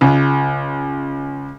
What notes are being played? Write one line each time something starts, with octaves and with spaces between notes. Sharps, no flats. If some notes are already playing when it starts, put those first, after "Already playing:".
C#2